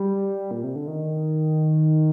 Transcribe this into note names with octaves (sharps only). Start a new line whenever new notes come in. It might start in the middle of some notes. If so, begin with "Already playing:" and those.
Already playing: G3
A#2
C3
D3
D#3